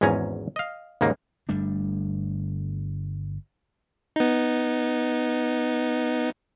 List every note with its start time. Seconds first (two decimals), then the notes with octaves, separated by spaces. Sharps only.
0.01 G#1 E2 G#2 C#4 G#5 A#5
0.56 D#5 F5
1.01 D#2 G#2 C#3 A#3 D#4
1.49 G1 G3 A3 D4
4.16 B3 D#4